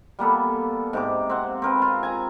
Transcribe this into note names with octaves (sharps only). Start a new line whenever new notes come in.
G3 A#3 B3 A4
G#2 C3 D6
C4 F#5
C4 A#4 B4
F4
G#5 A#5